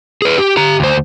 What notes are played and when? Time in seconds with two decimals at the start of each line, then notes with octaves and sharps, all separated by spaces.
0.22 G#4 B4
0.38 G4
0.57 G4 A#5
0.80 D2 C5